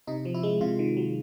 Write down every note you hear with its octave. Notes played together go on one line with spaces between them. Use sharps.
C3 D#4
F3
E4
G#3
C3 F4
D#3
F#3